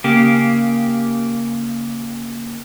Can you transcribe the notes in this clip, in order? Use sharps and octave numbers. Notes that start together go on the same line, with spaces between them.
C#3 A#3 G4